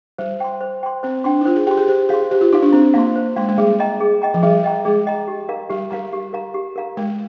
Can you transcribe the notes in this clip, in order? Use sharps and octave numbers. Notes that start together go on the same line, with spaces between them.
G3 C5
G5 C6
C5
G5 C6
C4 C5
D4 G5 C6
D#4
F4 C5
G#4
G4 G5 C6
G#4
G4 C5
G#4 F5 C6
G4 C5
F4
D#4 F5 C6
D4
C4 C5
A#3 F5 C6
C5
G#3 F5 C6
G#3
G3 G#4
D#5 G5 A#5
G#4
D#5 G5 A#5
F3
G3 G#4
D#5 G5 A#5
G#3 G#4
D#5 G5 A#5
G4
A#4 F5 A#5
G3 G4
G3 A#4 F5 A#5
G4
A#4 F5 A#5
G4
A#4 F5 A#5
G#3 A#4